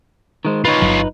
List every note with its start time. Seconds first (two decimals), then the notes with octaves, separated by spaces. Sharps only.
0.45 D#3 G#3 C5
0.65 D#4 F4 B4 C#5
0.82 G1 G2 F#3